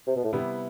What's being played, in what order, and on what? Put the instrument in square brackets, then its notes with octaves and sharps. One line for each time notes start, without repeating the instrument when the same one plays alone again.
[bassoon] C3
B2
A2
[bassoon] G2 [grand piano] C3 G3 B3 E4